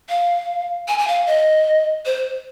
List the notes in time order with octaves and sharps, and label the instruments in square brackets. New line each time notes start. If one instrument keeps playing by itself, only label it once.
[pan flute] F5
G#5
G#5
F5
D#5
C5